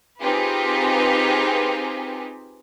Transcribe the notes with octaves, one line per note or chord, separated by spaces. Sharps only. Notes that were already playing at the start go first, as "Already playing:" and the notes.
C4 D#4 F4 G4 G#4 B4